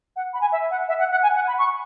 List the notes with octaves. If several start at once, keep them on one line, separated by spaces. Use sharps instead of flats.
F#5
B5
G#5
E5
F#5
E5
F#5
F#5
G#5
F#5
B5
C#6